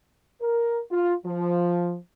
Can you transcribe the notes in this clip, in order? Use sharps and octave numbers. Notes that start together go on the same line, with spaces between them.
A#4
F4
F3